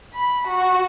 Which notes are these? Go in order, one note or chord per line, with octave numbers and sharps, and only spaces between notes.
B5
F#4